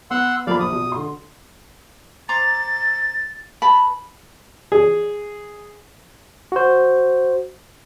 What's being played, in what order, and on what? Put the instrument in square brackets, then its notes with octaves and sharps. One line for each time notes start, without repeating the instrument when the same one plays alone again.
[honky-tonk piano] B3 [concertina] F#5 C6 E6
[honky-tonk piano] F3 A#3 B5 [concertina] D5 F5
[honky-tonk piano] A#1 [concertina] D#6
[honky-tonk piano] B2
D3 C6
[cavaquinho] C5 A#5 D6 [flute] A6
[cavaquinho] B4 A5 B5
[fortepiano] G#4
[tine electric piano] F#4 C5